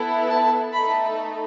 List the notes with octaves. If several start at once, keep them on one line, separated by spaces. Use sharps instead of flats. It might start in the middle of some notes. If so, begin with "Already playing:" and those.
Already playing: B3 E4 A4
A5
A3 D#4 A4 B5